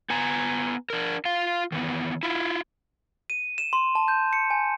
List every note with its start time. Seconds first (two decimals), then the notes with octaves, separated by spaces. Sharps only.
0.10 B3 G#5 A#5
0.90 D4 A#4
1.25 F4 F5
1.72 D#3 E3 B3
2.23 E4 F4
3.30 D#7
3.58 E7
3.73 C6
3.95 A5
4.08 G6
4.33 C#7
4.50 G#5